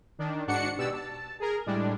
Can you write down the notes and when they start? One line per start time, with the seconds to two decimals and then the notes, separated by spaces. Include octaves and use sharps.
0.19 D#3 D4
0.47 G#2 D4 F#4 F#5 C#7
0.78 B2 G4 D5 E6
0.93 A5
1.40 G#4 A#4
1.66 A2 G3 G#3 D4